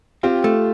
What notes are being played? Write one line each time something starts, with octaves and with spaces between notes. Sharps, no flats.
C4 F4 G4
A3